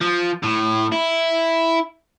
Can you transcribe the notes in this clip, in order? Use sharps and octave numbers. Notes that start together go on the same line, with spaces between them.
F3
A2
E4